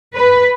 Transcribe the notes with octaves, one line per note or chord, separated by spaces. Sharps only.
B4